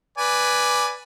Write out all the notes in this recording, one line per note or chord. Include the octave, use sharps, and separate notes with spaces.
B4 D5 G#5